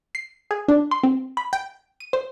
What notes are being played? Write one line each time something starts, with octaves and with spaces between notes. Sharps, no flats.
C7
G#4
D4
C6
C4
B5
G5
D#7
C5